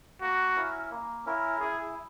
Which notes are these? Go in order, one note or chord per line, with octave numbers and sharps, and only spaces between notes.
A#3 F#4
C#4 E4 A#4
A#3
C#4 E4 A#4
E4 G#4